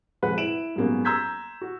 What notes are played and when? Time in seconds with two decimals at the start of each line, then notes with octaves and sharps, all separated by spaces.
0.22 F2 C3 G#3 B4 F#5 B5
0.38 E4 D7 E7 F#7
0.76 G#2 F#3 G3 A#3 B3 C#4
1.05 A#5 C6 E6 G6 G#6 B6
1.61 F#4